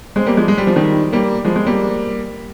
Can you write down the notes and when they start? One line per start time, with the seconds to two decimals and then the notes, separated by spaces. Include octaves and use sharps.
0.16 G#3 C4
0.26 G3 A#3
0.37 F3 G#3
0.48 G#3
0.58 G3
0.67 F3
0.76 D#3 G3
1.13 G3 A#3
1.45 F3 G#3
1.56 G#3 C4
1.66 G3 A#3